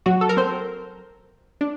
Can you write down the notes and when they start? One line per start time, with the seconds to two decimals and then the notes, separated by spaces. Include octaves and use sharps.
0.06 F#3 F#4
0.21 A4
0.29 A#4
0.37 C4 C5
1.61 D4